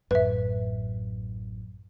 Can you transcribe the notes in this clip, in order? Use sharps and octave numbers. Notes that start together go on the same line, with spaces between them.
A1 F#2 B4 E5